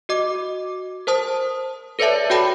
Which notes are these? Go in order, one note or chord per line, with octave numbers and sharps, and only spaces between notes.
F#4 D#5 D6
A#4 C5 A5 D#6
A4 B4 C#5 D5 E5 A5
F#4 A4 C#5 G5 A5 B5